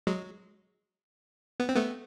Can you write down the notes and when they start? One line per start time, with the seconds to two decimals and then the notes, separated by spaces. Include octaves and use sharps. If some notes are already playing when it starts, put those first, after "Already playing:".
0.07 F#3 G#3
1.60 B3
1.69 C4
1.76 A3 B3